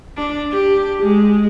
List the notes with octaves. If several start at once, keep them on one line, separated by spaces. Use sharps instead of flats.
D4
G4
G#3